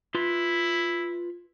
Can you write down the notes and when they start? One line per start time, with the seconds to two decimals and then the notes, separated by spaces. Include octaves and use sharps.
0.15 E4 F4 B4 C6